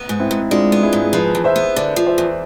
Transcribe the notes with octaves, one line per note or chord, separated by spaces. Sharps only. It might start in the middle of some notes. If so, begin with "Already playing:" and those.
Already playing: B3
G#2
C4 E4
G#2
G#3 D4 F4
B3
E4 G#4
G#2
F3 G#4 B4
E2
C5 E5
B3
D3 B4 D5
F3
C5 E5
E2